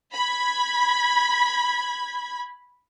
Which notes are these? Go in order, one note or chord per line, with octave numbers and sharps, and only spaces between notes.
B5 G#6